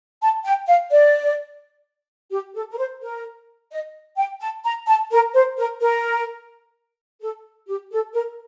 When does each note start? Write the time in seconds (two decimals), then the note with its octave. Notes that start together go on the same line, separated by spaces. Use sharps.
0.22 A5
0.45 G5
0.68 F5
0.91 D5
2.31 G4
2.55 A4
2.71 A#4
2.78 C5
3.02 A#4
3.72 D#5
4.17 G5
4.41 A5
4.65 A#5
4.87 A5
5.12 A#4
5.34 C5
5.58 A#4
5.81 A#4
7.21 A4
7.68 G4
7.92 A4
8.14 A#4